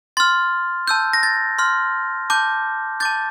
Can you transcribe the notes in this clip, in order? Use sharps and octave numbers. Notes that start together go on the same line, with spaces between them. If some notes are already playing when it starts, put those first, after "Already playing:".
C6 F6 A6
A5 E6 G6
A#6
A6
C6 F6
A5 D6 G6
A5 D6 G6 A6